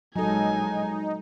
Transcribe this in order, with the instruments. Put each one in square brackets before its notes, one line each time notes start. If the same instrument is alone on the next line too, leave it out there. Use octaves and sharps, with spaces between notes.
[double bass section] A#1 G#3 [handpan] F#3 A4 [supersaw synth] D#4 [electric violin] G#5